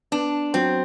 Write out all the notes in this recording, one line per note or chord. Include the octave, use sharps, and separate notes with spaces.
B3 D4
F#3 C4